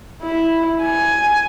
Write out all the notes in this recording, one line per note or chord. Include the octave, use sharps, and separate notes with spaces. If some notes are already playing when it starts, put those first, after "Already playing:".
E4
G#5